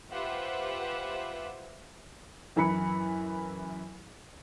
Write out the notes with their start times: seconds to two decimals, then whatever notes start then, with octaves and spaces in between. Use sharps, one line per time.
0.11 F4 G4 B4 C5 E5 F#5
2.56 F#2 E3 E4 B5 C#7